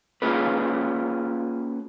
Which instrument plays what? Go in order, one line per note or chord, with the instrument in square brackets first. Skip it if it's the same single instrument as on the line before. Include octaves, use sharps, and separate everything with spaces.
[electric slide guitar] A#3 C#4 F4 G#4 B4